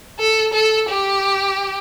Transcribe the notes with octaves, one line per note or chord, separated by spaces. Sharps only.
A4
A4
G4